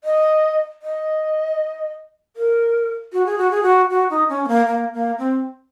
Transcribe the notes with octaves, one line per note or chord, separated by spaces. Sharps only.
D#5
D#5
A#4
F#4
G#4
F#4
G#4
F#4
F#4
D#4
C#4
C4
A#3
A#3
A#3
C4